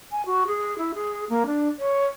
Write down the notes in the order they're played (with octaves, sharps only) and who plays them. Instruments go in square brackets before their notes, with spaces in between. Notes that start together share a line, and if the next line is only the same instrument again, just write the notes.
[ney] G#5
F#4
G#4
E4
G#4
A#3
D4
C#5